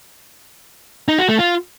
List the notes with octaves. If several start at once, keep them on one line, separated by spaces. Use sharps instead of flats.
D#4
F#4
A3
F4